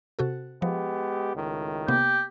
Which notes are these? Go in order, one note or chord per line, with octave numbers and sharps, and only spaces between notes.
C3 F#4 A4
F3 G#3 B3 G4
C#2 A2 D#3
C3 A#3 B3 G4